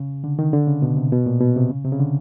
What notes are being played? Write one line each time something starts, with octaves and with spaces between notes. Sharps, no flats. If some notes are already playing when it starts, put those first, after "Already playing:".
Already playing: C#3
D3
D#3
D3
C#3
B2
C3
B2
A#2
B2
C3
C#3
C3
C#3
D3